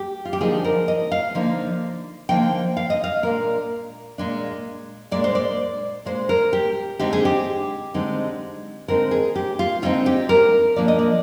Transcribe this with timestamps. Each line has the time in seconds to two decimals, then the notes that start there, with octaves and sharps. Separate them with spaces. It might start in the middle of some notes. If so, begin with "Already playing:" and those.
Already playing: G4
0.25 F4
0.33 G4
0.41 D3 F3 A#3 D#4 G#4
0.64 A#4
0.88 D#5
1.12 F5
1.35 D3 F3 A#3 D#4
2.29 D3 F3 A#3 D#4 G5
2.77 F5
2.90 D#5
3.04 F5
3.23 A#2 G#3 D4 A#4
4.18 A#2 G#3 D4
5.11 A#2 G#3 D4 D5
5.24 C5
5.35 D5
6.05 A#2 G#3 D4 C5
6.29 A#4
6.53 G4
6.99 D3 G#3 C4 D#4 G4
7.13 G#4
7.25 G4
7.94 D3 G#3 C4 D#4
8.88 D3 G#3 C4 D#4 A#4
9.11 G#4
9.35 G4
9.59 F4
9.82 D3 G#3 C4 D#4 F4
10.06 G4
10.29 A#4
10.76 A#2 F3 A#3 D4 D5
10.88 D#5
10.99 D5